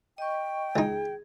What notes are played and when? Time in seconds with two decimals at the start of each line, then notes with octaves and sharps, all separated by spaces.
0.18 D#5 G5 C#6
0.76 C#2 D#4 G#4